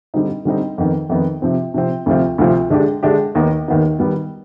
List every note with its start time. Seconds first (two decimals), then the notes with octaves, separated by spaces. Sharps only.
0.14 D3 G3 C4 D#4
0.45 D3 G3 C4 D#4
0.78 F2 D#3 B3
1.09 F2 D#3 B3
1.42 C3 F3 C4
1.74 C3 F3 C4
2.06 D2 C3 F3 C4 F4
2.38 D2 C3 F3 C4 F4
2.70 D3 G#3 D4 G4
3.03 D3 G#3 D4 G4
3.35 D#2 D#3 B3 D#4
3.68 D#2 D#3 B3 D#4
3.99 D#3 G3 B3